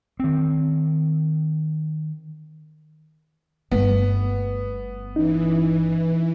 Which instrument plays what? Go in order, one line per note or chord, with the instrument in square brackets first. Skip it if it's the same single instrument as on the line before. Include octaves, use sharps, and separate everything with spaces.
[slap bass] D#3 C4
[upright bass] G1 A3 [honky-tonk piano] B3
[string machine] E3 [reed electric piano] C#4 D#4